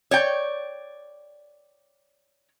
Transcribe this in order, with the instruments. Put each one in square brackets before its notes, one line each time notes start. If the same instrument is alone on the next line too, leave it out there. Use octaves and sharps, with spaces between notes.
[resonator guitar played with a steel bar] C#5 D5 G5